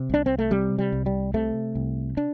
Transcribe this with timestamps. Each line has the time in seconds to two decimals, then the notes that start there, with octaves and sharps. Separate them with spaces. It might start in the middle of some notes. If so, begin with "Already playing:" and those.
Already playing: C3
0.09 C2 D4
0.26 C4
0.39 A3
0.51 C3 G3
0.78 G3
0.92 C2
1.06 G3
1.34 C3 A3
1.75 C2
2.17 D4